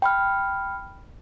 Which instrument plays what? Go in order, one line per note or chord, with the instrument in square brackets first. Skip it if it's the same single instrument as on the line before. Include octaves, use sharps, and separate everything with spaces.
[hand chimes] G5 B5 F6